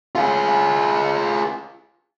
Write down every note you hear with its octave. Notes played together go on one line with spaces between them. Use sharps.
F4 G#4